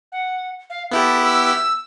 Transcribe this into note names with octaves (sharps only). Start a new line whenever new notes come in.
F#5
F5
B3 E4 G4 A4
E6